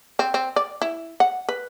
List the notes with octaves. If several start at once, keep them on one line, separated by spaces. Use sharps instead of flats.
C4
C4
D5
E4
F#5
B4